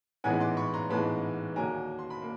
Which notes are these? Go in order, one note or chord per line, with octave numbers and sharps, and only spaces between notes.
A1 G#2 E3 G#3 B3 F#5 G#5
C6 D6
B5 C#6
A#5 C6
A1 G#2 E3 G#3 B3 A5 B5
D#2 D3 F#3 A#3 G#5 A#5
C6
B5
A#3